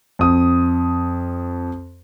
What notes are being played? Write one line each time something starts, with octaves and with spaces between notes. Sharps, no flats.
F2 D#6